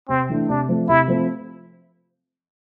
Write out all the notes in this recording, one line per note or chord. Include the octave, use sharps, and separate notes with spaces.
C3 C4
E3 A3 D4
C3 D4
F3 A3 C4
C3 E4
F3 A3 C4